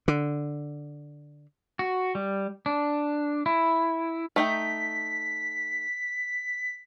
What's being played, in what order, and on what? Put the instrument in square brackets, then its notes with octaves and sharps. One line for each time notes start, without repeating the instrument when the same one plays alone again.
[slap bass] D3
[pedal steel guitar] F#4
G3
D4
E4
[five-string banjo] A3 D#4 G5 [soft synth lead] B6